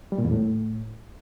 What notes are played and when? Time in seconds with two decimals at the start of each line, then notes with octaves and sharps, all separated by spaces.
0.12 G3
0.18 A#2
0.25 E2
0.31 A2